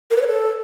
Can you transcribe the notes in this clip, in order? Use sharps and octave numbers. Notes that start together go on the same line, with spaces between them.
A#4
B4
C#5
A4